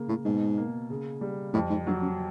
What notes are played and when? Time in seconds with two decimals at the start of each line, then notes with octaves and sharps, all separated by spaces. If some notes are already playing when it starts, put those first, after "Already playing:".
Already playing: C#3 A#3
0.09 A2
0.25 G#2 B2
0.57 A#3
0.90 C#3
1.21 G3
1.54 F2 A2
1.70 G#2
1.86 G2 F#3
2.02 F#2